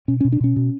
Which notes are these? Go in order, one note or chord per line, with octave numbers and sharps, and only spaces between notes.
B2 C#4
C#4
B2
D4
B2 C#4
B2